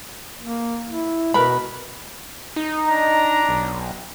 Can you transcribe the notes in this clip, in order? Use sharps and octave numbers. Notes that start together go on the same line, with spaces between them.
A#3
E4
B2 A#4 B4 B5
D#4
D4 A#5
B1